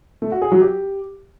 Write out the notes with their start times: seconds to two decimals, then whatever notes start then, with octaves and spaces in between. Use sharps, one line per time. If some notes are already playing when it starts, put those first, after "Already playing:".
0.22 A3
0.32 F#4
0.42 G#4
0.52 F#3
0.61 G4